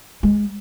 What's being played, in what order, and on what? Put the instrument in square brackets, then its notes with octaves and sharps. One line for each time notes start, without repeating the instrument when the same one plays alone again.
[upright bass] G#3